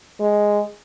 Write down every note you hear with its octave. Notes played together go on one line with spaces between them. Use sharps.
G#3